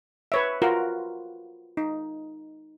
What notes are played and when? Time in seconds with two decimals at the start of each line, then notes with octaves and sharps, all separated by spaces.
0.32 B4 C#5 E5
0.62 F4 F#4 A#4
1.77 D#4